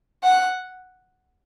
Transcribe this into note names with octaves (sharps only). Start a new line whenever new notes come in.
F#5